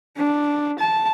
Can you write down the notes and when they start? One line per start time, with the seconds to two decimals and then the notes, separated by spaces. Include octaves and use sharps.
0.17 D4
0.78 A5